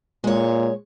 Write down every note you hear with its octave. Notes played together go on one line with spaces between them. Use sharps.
A#2 G#3 C#5